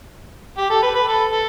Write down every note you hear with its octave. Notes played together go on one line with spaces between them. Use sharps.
G4
A4
B4
B4
A4
A4